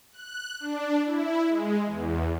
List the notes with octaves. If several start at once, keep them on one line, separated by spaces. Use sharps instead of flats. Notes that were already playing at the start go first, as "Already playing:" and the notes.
F#6
D4
E4
G#3
E2